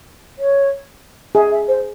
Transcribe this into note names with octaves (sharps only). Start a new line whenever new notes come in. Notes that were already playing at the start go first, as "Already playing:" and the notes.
C#5
G#4 E5
E5
C5